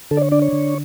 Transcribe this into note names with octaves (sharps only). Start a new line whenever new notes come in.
D3 A4
D5
C#5
D4 D5
C#5
D3